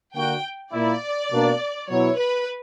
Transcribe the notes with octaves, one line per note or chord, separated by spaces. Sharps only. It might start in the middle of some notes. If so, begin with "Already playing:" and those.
D3 A#3 D4 F#4 G5
A#2 A#3 E4 D5
B2 A#3 D4
B2 F#3 B3 E4 C#5
B4